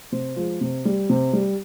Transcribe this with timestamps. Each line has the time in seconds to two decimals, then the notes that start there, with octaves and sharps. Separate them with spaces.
0.12 C3 C5
0.36 F3 G#3
0.61 C3
0.85 G3
1.10 C3
1.33 G3